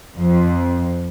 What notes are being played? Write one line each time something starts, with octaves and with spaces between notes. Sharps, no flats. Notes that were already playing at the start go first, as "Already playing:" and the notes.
F2